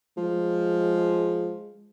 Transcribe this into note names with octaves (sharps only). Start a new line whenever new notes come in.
F3 G#3